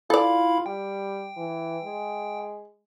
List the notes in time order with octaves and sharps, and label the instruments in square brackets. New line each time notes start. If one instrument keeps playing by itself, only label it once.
[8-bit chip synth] E4 F5 B5 [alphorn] F4 [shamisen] A4 D5
[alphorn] G3 [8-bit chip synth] G5
[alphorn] E3
G#3